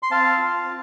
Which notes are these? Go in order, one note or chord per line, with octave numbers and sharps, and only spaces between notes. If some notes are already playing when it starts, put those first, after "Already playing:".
C6
C4 F5 A5
F4
C4